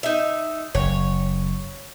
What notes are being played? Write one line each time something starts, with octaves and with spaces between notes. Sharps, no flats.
D#4 E5
F#1 C#5